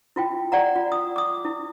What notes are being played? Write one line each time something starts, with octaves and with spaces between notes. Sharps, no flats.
E4 F4 G5
D5 F#5 A#5
F4
D#6
D6 D#6
E4